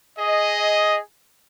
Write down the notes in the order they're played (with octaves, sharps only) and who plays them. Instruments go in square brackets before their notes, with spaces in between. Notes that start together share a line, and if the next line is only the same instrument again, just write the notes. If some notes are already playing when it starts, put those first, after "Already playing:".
[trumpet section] G#4 D#5